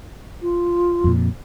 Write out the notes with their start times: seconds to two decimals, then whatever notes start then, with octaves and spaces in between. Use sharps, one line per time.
0.42 F4
1.04 F2 A#2